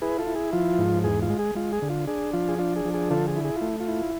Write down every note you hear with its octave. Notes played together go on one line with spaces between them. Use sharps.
E4 G#4 B4
F4 A4
E4
G#4
F3 F4
G#2
E2 G#4
F4
G#3
G#4
G#3 F4
G#4
D3
F4
D4 G#4
F3 F4
G#4
D4 F4
G#4
F3
G#4
D3 F4 A4
G#4
E4
G#4
F4
A3
F4
E4